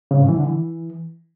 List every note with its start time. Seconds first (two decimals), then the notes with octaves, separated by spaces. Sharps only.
0.11 C#3
0.20 G#2
0.28 E3
0.37 D3
0.46 E3